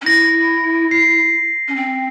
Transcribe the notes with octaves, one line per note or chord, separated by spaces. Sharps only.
C#4
E4 A#6
C7
C#4
C4